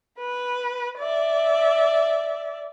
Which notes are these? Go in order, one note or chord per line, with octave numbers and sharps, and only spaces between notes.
B4
D5 E5